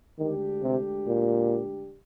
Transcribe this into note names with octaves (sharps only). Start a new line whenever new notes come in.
D2 D3 D#3 G#3 D4 G4
C3
A#2